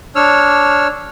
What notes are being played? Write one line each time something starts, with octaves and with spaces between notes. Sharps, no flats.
D4 C#5 E6 F6